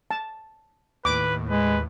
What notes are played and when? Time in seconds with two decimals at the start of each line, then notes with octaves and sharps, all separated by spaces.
0.11 A5
1.05 D#2 A2 B4 D6
1.50 G#3 B4